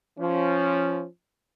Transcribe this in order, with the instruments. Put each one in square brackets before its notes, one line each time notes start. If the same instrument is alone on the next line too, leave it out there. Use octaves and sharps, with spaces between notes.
[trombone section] F3 C#4